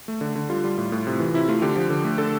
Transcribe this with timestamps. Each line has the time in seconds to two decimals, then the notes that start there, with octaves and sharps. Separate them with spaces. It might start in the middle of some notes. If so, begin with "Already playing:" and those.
0.08 A3
0.21 D3
0.35 D3
0.49 G3 F4
0.64 G3
0.78 A2
0.92 A2
1.07 C3
1.20 E3
1.34 C3 E4
1.48 A3 F4
1.62 D3 G4
1.76 F3
1.90 D3
2.04 A3
2.18 D3 A4